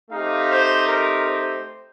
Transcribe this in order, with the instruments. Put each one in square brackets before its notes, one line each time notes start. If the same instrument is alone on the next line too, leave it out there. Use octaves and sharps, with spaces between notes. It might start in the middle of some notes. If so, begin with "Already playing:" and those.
[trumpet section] A3 C4 D#4 G4 F5
C5
A#4
C5